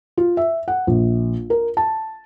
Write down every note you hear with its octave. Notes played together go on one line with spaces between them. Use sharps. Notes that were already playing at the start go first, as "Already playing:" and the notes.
F4
E5
F#5
A#1
A#4
A5